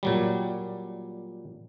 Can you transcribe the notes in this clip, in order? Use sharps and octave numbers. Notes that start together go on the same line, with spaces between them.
A#2 F#3 G3